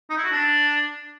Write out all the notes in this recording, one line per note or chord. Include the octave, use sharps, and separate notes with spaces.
D#4
E4
F#4
D4